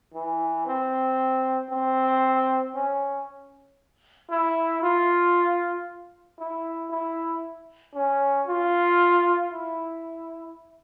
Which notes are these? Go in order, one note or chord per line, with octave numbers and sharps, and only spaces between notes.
E3
C4
C4
C#4
E4
F4
E4
E4
C#4
F4
E4